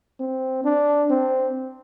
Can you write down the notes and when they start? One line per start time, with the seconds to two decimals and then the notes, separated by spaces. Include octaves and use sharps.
0.20 C4
0.64 D4
1.10 C4